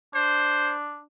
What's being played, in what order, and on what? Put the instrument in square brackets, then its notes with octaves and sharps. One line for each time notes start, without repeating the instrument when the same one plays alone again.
[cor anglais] D4 [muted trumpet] C5